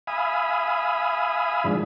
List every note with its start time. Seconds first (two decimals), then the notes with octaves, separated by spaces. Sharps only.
0.07 E5 F5 G#5 B5 D#6
1.64 G#2 D#3 F3 D4